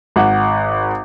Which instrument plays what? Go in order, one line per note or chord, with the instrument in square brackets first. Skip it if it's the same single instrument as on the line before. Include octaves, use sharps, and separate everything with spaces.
[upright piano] G#1 F#5